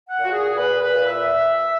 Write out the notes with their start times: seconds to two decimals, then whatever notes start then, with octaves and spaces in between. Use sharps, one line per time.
0.09 F#5
0.20 A#2 F#4
0.33 G#4
0.57 A#2 B4
0.82 B4
0.93 A#2
1.07 E5